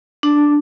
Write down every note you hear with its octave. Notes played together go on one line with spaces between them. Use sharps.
D4